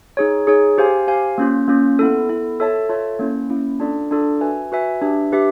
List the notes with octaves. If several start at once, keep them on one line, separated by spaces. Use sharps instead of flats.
D#4 G#4 C#5
D#4 G#4 C#5
G4 C5 F5 G#5
G4 C5 F5 G#5
A#3 C#4 F4
A#3 C#4 F4
B3 E4 A4
B3 E4 A4
F4 A4 C#5 E5 A5
F4 A4 C#5 E5 A5
A#3 C#4 E4
A#3 C#4 E4
D4 F4 A4 D5
D4 F4 A4 D5
F#4 B4 E5 G#5
F#4 B4 E5 G#5
D4 G4 B4 E5
D4 G4 B4 E5